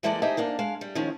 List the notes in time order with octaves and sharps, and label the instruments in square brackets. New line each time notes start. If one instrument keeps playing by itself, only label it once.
[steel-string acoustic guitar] E3 G3 G#3 A#3 A4 D5
D#4 G4 G#4 C5 D#5 E5
G#2 A#3 D4
G#3 F5
G3
D#3 F3 G#3 C#4